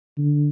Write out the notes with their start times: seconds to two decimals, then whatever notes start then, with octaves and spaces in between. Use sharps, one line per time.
0.18 D3